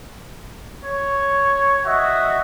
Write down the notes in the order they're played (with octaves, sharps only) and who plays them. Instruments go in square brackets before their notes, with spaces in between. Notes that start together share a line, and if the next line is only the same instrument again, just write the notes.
[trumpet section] C#5
F#4 D#5 E5